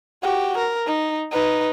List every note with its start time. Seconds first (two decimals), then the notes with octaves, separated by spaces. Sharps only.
0.23 F#4 G4
0.58 A#4
0.86 D#4
1.31 D#4 B4